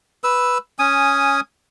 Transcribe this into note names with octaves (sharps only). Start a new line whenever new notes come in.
B4 E6
C#4 G#5 D#6